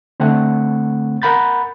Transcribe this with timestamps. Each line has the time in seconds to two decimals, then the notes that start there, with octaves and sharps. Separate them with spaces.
0.20 D3 A3 C4 F#5
1.22 A#4 F#5 B5 G6 A6